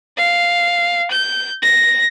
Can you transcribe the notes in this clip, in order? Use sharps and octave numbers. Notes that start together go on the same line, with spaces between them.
F5
G6
A#6